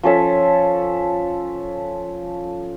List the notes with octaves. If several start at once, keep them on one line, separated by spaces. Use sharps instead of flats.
F3 C#4 A4 E5